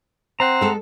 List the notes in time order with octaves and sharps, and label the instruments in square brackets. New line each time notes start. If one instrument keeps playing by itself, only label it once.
[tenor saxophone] C4 [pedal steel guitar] F#5 A#5
[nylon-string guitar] G#3 A4